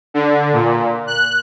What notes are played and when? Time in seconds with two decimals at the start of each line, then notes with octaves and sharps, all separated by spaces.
0.14 D3
0.53 A#2
1.07 F#6